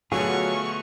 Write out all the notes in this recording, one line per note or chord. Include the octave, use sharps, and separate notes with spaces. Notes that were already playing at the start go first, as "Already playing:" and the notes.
B2 D3 F#3 A3 F4 G#4 C#6